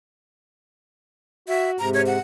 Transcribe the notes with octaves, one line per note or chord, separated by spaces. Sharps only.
F#4 E5
G#2 C3 A#5
C#5
F#5